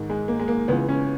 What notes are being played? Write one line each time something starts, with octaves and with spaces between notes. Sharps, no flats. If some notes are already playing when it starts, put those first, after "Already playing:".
Already playing: G#2 D#3
G#3
A#3
G#3
A#3
C#2 C#3 E3 B3
C#4